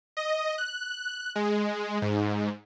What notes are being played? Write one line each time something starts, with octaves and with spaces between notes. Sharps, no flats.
D#5
F#6
G#3
G#2